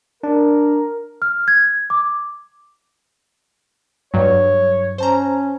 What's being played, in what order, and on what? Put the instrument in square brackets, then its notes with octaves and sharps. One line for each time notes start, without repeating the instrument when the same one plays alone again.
[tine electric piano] D4 [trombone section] A#4
[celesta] F6
G#6
D6
[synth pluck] G2 F#3 [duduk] C#5
[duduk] C#4 [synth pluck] C5 A5 A#5